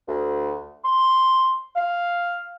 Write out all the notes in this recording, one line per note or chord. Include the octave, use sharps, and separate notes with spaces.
D2
C6
F5